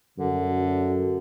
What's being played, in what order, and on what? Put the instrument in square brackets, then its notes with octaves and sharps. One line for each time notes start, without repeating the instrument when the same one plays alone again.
[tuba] F#2 [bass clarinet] D3